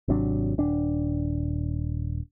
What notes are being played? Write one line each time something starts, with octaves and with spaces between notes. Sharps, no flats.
G#1 C3 F#3 D4
D#1 D4